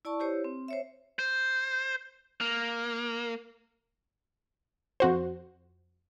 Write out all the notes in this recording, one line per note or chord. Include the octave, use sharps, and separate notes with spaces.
E4 D5 A5 C#6
E4 G4 C5 C#5
C4
C5 C#5 E5
C5
A#3
F2 F#4 C5